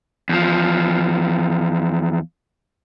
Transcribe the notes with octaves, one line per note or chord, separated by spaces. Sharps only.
E2 F3